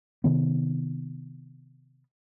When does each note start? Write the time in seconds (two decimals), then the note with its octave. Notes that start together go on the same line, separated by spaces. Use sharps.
0.24 C3 D#3 B3